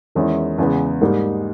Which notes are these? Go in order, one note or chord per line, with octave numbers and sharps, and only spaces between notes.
E2 D#3 G#3 C#4 E4
E2 C#3 G#3 B3
G#2 G3 A#3 D#4